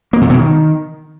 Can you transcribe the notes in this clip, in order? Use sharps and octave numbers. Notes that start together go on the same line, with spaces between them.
A#3
A#2
B2
D#3